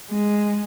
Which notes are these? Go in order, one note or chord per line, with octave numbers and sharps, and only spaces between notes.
G#3